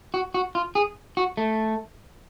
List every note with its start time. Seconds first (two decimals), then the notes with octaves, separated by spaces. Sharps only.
0.14 F#4
0.34 F#4
0.55 F4
0.75 G#4
1.17 F#4
1.37 A3